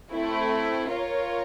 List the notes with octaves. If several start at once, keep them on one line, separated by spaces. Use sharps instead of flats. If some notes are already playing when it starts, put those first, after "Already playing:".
A3 C4 E4
F4 A#4 C#5